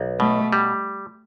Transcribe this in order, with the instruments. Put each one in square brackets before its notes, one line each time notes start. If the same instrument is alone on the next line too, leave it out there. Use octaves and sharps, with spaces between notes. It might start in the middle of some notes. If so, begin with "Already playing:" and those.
Already playing: [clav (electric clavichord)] B1
[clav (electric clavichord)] B2 [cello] A3
[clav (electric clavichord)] G3